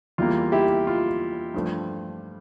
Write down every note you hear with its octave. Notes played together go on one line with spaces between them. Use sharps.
E2 E3 G3 A#3 F4
E4 G4
F4
G2 F3 A3